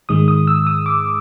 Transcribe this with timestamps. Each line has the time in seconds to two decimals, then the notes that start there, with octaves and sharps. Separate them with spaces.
0.09 G#2 D#3 G#3 D#6
0.28 D#6
0.47 E6
0.67 D#6
0.86 D6